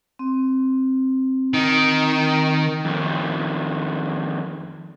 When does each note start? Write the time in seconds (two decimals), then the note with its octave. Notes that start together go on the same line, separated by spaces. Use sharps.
0.19 C4
1.54 D#3
2.85 F2 D#3